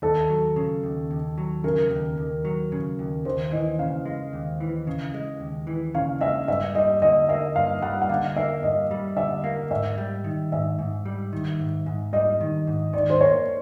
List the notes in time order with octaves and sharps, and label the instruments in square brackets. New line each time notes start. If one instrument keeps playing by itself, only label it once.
[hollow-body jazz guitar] D#2 [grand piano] A4
[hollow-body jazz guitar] F#3
C#3
D#2
D#2
F#3
[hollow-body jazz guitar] C#3 [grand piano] A#4
[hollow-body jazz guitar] D#2
D#2
F#3
C#3
D#2
[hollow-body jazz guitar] D#2 [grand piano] C5
[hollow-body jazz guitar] E3 [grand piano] D#5
[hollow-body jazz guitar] C#3 [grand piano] F5
[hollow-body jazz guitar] G#3
D#2
E3
C#3
G#3
D#2
E3
[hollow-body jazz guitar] C#3 [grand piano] F5
[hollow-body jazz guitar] G#3 [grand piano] E5
[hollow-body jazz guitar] G2 [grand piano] E5
[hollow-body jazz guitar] G3 [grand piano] D#5
[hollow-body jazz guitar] D3 [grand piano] D#5
[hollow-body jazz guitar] A#3 [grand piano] E5
[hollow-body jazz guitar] G2 [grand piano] F5
[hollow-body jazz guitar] G3 [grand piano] F#5
[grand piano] F#5
[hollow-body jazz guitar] D3 [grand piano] F5
[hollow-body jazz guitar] A#3 [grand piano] E5
[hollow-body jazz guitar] G2 [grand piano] D#5
[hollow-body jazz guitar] G3
[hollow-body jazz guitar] D3 [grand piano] E5
[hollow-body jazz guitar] A#3 [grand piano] F5
[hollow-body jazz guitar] G#2 [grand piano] E5
[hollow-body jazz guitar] G3
D#3
[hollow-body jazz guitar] G#2 [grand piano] E5
[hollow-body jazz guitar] G#2
G3
D#3
G#2
G#2
[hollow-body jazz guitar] G3 [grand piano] D#5
[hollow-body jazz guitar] D#3
G#2
[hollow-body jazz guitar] D#3 [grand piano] D5
[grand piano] C5
[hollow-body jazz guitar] A#3 [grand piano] C#5